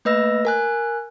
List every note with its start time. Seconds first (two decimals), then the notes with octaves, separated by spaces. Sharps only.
0.05 A3 A#3 B4 D#5 E6 A#6
0.45 A#4 G#5 F#6